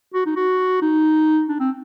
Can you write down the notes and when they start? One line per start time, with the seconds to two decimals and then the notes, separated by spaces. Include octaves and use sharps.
0.14 F#4
0.26 D#4
0.36 F#4
0.82 D#4
1.49 D4
1.60 C4